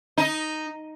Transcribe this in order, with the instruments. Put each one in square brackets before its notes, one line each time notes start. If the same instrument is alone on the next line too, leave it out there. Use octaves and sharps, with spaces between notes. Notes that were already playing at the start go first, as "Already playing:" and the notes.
[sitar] D#4